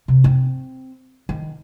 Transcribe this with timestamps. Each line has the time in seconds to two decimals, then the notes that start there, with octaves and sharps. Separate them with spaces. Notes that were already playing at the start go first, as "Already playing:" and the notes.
0.08 C3
0.24 C4
1.29 D#3